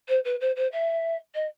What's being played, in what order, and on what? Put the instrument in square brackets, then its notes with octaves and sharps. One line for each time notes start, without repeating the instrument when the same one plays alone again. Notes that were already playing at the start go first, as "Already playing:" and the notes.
[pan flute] C5
B4
C5
C5
E5
D#5